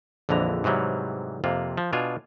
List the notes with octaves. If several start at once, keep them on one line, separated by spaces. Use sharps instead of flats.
A#1 F2 D3 E3 A#5
G#2 C3 E3 F#3 G3
F2 C3 A#3 F4
F3
B2 D4 F4 G#5